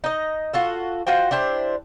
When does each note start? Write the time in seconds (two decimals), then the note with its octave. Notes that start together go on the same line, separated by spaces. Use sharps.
0.04 D#4 D#5
0.53 F4 F#4 A4
1.07 F4 F#4 C5 G5
1.31 D4 E4 G4 C5